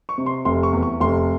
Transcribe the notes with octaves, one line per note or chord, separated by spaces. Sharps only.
C#6
C3
C6
F1 C6
C#6
E2
C#6
F1 C6